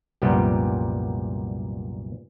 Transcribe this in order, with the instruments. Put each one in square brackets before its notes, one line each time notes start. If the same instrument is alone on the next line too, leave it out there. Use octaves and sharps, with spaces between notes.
[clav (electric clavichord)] C2 F#2 A#2 F3 G3 B3